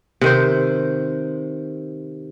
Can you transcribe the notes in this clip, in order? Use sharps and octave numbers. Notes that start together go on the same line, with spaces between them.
C3 D#3 C5